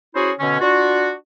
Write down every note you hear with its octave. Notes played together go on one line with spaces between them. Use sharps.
C#4 E4 F#4 G#4 C5
B2 D3 C#4
D4 F4 F#4